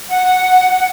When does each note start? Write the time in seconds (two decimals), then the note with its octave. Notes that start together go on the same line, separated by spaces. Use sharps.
0.10 F#5